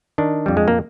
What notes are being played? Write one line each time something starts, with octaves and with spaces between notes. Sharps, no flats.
D#3 D4
F2 G3
G#3
A#3